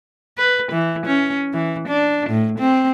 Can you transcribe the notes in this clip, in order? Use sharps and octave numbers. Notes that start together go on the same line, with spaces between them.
B4
E3
C#4
E3
D4
A2
C4